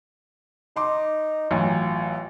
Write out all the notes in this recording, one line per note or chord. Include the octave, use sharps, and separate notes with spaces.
D#4 C6 D6
A1 F#3 F4 G#5